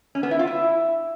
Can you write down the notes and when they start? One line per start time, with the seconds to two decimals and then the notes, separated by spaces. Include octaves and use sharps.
0.15 C#4
0.23 B3
0.31 E4
0.39 F4
0.47 E4